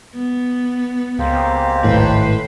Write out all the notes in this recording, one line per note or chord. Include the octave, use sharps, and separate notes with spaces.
B3
C#2 A#3 C4 G4
G#1 A2 B4 C5